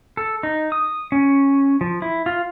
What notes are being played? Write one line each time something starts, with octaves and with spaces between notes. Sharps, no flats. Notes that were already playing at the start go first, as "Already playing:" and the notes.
A4
D#4
D#6
C#4
F3
E4
F4